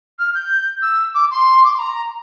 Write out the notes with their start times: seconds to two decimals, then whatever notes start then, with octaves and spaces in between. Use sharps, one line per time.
0.19 F6
0.35 G6
0.82 E6
1.14 D6
1.31 C6
1.64 D6
1.71 C6
1.79 A#5